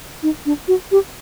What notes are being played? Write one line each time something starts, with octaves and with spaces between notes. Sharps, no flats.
D#4
D4
F#4
G4